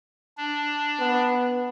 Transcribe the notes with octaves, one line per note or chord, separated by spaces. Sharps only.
D4
B3